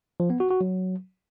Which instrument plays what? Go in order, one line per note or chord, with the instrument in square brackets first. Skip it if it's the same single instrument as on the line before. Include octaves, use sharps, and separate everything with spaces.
[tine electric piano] F3
B3
F#4
F#4
F#3